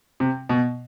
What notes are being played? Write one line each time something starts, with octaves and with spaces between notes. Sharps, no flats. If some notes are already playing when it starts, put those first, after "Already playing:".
C3
B2